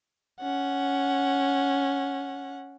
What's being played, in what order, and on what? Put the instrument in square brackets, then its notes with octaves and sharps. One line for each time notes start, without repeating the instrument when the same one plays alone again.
[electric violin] C#4 F#5